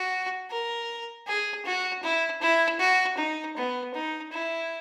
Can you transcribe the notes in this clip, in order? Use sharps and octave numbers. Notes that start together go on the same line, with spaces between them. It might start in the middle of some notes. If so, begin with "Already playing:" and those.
Already playing: F#4
A#4
G#4
F#4
E4
E4
F#4
D#4
B3
D#4
E4